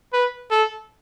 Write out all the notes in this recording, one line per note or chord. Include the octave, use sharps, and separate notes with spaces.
B4
A4